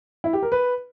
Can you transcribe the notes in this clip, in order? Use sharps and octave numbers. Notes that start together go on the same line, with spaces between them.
E4
G4
A#4
B4